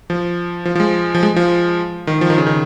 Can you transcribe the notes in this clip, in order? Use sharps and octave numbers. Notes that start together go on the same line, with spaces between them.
F3
F3
F3
G#3
F3
G#3
F3
D#3
F3
D#3
C#3
D#3